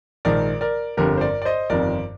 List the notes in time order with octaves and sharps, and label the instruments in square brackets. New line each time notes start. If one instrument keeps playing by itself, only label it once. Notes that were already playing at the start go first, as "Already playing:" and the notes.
[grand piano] A#1 G#2 D#3 A#4 D5
A#4 D5
G1 F2 D3 G4 A#4
C5
A#4 D5
D5
C5 D#5
G1 F2 D#3 A#4 D5